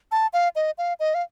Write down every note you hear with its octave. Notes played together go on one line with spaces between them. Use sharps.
A5
F5
D#5
F5
D#5
F5